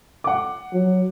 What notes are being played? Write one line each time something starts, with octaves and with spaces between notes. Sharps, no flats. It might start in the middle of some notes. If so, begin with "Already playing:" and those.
F#5 D6
F#3